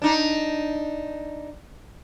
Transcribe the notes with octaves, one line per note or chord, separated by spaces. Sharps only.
D4 D#4